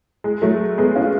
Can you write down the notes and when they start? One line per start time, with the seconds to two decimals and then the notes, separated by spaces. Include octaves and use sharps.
0.24 G#3
0.42 F#3 A3
0.77 G#3 B3
0.95 C#4 F4